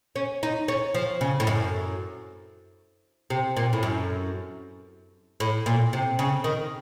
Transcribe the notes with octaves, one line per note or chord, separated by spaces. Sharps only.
C#4
D#4
C#4
F3
C#3
A2
F#2
C3
A#2
A2
F#2
A2
A#2
C3
C#3
D#3